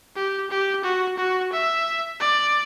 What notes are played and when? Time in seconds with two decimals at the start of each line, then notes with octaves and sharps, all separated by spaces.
0.15 G4
0.50 G4
0.84 F#4
1.18 F#4
1.52 E5
2.21 D5